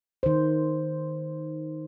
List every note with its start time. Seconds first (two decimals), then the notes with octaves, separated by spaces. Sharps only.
0.23 D#3 C5